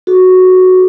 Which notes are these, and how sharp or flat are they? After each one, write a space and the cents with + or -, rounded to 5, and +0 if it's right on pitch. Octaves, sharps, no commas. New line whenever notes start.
F#4 +0 A4 -35